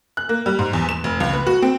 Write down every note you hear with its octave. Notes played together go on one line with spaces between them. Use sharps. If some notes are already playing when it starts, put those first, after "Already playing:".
F#6
A#3
G3
G#2
E2
E7
F1
C#2
B4
F#4
C4